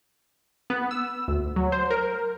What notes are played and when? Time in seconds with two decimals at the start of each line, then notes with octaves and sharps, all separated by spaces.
0.70 B3
0.91 E6
1.28 D2
1.56 F#3
1.72 C5
1.91 A#4